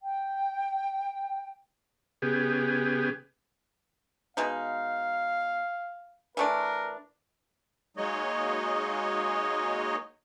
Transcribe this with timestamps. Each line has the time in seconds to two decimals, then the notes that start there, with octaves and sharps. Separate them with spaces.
0.02 G5
2.22 C#3 B3 G4 G#4
4.37 B2 G#3 D#4 F5
6.37 E3 A3 D4 A#4
7.97 F#3 G#3 A#3 D#4 C#5 D#5